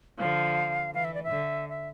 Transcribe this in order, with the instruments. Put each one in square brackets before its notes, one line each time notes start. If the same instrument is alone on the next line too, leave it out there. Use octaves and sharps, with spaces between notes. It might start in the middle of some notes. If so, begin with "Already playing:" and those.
[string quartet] D3 F3 [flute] F5
[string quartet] E3 [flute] F5
[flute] E5
D5
E5
[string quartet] D3
[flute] E5